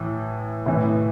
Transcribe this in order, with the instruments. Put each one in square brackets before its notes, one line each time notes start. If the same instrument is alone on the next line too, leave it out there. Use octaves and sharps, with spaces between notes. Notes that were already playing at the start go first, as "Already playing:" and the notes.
Already playing: [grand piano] A2 E3
A2 E3